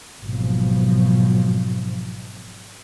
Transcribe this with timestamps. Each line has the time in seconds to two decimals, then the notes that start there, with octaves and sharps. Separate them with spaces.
0.23 G#1 B2 F3 F#3